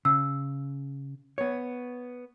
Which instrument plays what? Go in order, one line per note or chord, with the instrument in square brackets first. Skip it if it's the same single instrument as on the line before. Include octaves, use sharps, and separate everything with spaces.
[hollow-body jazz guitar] C#3 [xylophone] E6
[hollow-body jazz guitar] B3 C#5